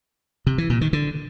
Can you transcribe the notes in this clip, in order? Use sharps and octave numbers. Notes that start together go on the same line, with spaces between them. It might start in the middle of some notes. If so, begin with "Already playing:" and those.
C3
E3
A#2
D#3
D3